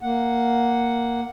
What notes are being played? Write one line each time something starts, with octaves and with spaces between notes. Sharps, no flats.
A#3 F#5